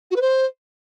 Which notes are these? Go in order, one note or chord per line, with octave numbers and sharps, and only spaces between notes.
F#4
B4
C5